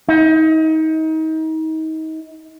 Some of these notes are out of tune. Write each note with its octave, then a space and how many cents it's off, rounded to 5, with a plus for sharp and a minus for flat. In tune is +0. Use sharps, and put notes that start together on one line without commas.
D#4 +30